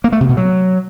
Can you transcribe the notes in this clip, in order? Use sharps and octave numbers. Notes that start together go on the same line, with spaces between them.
A#3
A3
C3
B2
F#3